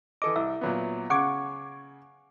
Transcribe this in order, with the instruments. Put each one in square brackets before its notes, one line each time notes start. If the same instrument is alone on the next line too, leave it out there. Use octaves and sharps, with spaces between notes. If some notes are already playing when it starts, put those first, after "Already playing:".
[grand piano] E3 A4 D#5 [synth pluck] D6
[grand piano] C2 [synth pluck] E5
[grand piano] A#2 F#3 B3
[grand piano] C#3 G#6 [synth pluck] F#5 C#6 D6